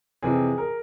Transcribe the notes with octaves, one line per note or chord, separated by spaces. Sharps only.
F2 C3 E3 G#4
A#4